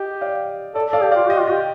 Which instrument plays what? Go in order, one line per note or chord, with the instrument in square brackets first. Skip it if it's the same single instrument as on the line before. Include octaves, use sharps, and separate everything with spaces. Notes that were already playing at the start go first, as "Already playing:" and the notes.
Already playing: [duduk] G4 [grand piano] D#5
[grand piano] D5 F5
[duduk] A4 [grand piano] D5
[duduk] A4 [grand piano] D5 F5
[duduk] G4
[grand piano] D5 F5
[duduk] F4
[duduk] G4 [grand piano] D#5
[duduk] F4
[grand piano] D#5
[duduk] G4